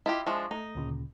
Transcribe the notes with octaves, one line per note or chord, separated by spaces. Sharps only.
E4 F4 G4 D#5
F3 G#3 D4 E5 C#6
A3 D#4
D2 A#2 C#3